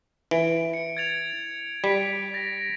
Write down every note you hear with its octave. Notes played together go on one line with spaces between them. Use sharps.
E3 D7
C#7
G#6 A6 F7
G3 B6 D7
A6 A#6